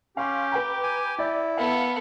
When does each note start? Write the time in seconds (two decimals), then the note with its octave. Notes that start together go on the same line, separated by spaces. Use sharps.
0.17 C#4 G4 F5 C6
0.52 B4 G5 A#5
0.83 G#5
1.19 E4 D5
1.57 B3 A4 F5